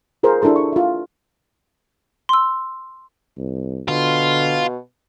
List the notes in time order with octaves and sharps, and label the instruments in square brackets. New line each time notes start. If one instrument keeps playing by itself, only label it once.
[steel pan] F4 G#4 A#4 C5
D4 E4 G4 A4 C6
C#6
F4 E5
[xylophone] C6 E6
[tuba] C2
[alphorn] B2 [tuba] D3 [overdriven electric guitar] F4